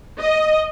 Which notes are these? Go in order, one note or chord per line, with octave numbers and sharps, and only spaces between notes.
D#5